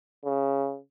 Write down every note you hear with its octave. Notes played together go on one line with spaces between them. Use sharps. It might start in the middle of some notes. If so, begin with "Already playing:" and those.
C#3